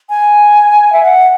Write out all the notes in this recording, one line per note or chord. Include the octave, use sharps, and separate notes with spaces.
G#5
E5
F#5